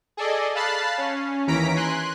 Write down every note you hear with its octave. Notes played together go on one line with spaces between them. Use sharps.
G#4 A4 D5 D#5
F5 A5 B5 F#6 A6 C7
C#4
D#2 E3 C#4 A#5 B6 D7
G#5 C6 F#6